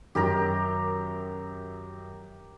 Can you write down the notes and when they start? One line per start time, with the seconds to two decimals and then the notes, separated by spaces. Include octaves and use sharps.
0.15 F#2 D#3 G4 A#4 A#5